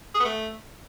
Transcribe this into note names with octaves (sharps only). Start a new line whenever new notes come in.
G#4
B3
A3